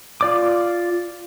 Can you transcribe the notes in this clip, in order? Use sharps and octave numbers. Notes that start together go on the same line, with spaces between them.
F4 D5 D6